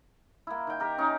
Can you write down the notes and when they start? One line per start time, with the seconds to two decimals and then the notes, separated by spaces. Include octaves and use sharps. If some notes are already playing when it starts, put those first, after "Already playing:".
0.47 A#3 E4
0.67 D#3 G5
0.80 G4 A#4
0.98 C#4 D#4